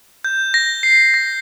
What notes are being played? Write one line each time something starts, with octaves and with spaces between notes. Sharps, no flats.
G6
A#6
C7
A#6